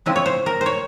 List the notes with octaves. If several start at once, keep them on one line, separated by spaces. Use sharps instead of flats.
C#3 F3 G#3 C4 E4
C#5
C5
A#4
C5
C#5